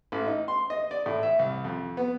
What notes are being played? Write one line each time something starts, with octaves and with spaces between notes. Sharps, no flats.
A1
D#4
C6
D#5
D5
A2
E5
C2
F2
B3